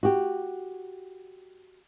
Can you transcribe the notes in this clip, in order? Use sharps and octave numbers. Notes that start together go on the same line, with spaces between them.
F#4 G4